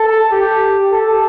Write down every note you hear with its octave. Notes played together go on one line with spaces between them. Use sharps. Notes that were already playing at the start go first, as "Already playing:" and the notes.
Already playing: A4
G4
A4